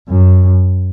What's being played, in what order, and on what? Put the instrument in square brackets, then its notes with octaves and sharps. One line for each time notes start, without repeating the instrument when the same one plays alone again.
[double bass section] F#2